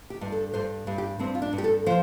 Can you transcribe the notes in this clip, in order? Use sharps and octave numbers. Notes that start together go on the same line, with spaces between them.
G4
G2
A4
G2 C5
G2
G4
G2 C4
F4
D4
G2
G4
A4
F3 C5